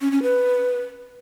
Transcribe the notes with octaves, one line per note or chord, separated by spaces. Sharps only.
C#4
C#4
B4